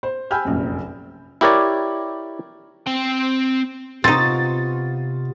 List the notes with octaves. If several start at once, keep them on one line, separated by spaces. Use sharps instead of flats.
C5
G5 G#5 B5 E6 F6 G6
F1 A#1 F#2
E4 G4 A#4 C#5 D5
C4 G5
C3 B3 C4 D#4 F4 C#6 A6